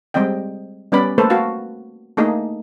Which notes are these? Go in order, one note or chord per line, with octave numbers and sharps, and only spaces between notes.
G3 G#3 C4 D#5 G5
G3 B3 C#4 B4 D5 B5
A3 A#3 A4 B4 C5
F#4 F5 A5
A3 A#3 D4 D#4 G#4 D#5